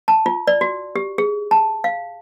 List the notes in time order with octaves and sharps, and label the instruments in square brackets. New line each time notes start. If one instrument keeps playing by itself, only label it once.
[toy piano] A5
F4
D5
F#4
G4
G#4
A5
F5